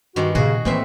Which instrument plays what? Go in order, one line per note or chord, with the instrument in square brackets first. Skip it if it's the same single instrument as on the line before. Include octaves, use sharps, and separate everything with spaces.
[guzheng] G2 D#3 G#3 [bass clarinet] F#4
[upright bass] A#2 [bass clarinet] C#3 [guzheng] F#4 G#4
[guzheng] A2 C4 E5 [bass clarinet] E3 [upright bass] A#3